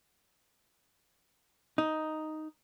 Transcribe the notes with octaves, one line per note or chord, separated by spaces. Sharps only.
D#4